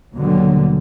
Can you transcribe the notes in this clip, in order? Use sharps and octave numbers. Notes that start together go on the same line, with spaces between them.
D#2 B2 D3 F#3 G3